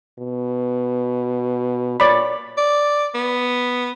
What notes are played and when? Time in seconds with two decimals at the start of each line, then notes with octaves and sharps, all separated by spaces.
0.19 B2
2.00 A#2 C#5 D5 B5
2.58 D5
3.15 B3